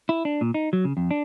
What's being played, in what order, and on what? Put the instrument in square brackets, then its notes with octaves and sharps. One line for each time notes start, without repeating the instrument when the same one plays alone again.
[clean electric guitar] E4
D4
A#2
D#4
F#3
C#3
F2
D4